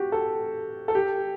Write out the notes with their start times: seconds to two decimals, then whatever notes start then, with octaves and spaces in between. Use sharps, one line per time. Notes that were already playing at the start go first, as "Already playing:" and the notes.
Already playing: F#4 G4
0.12 A4
0.88 A4
0.95 G4